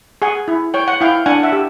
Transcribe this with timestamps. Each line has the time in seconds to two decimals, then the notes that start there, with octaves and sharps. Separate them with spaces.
0.22 G#4 F#5 G#5
0.48 E4
0.74 C#5 G5
0.88 F#5
1.01 E4 F5 G5
1.26 D4 F#5 G#5
1.43 E5 F#5
1.52 G4